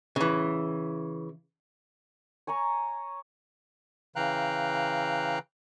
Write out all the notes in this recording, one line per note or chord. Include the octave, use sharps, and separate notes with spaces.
C#3 E3
C#5 G#5 A#5 C#6
C#3 E3 F5 G5 A#5 F#6